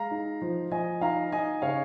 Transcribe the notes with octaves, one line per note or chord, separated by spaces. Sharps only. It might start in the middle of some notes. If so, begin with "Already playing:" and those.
Already playing: G#3 F5 A#5
D#4
F3
F3 D#5 G#5
D#4 F5 A#5
D#4 D#5 G#5
C#3 C#5 F5